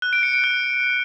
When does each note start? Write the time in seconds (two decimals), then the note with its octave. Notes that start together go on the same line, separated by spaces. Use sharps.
0.02 F#6
0.13 D7
0.23 C#7
0.33 D7
0.44 F#6